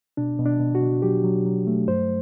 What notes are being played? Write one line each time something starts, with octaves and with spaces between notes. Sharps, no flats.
B2 D4
B2
D4
B2
F#4
B2
F#3 G4
F#3
F#3
A3
G2 C5